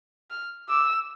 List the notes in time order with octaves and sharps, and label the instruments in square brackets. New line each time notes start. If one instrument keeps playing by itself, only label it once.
[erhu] F6
[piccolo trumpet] D6 [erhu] E6